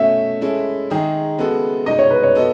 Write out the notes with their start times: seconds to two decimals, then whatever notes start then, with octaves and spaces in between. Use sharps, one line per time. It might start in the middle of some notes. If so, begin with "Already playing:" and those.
Already playing: B2 A3 C#4 E5
0.41 G#3 C#4 E4 A4
0.90 D#3 G#3 D#4 G#4
1.38 C#3 G#3 B3 F#4 A4
1.86 B2 G#3 D#4 D#5
1.99 C#5
2.10 B4
2.23 C#5
2.35 B3 F#4 A4 D#5